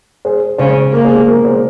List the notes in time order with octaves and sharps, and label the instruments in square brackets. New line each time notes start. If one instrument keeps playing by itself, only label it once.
[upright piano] G#4 C5
[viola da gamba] C#3 [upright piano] G#4 C5
[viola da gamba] A#3 [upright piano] A#4
[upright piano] G#4 C5
G#4
A#4
G#4 C5